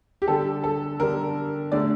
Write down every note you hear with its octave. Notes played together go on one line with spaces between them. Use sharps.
G4
D3 G3 D4 A4
A4
D3 G3 D4 A#4
D3 A3 C#4 D5